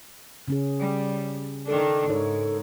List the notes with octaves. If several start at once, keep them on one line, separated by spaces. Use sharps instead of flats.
C#3 C#4 G#4
G3
D#3 D4 A4
G#2 D#4 A#4 C#5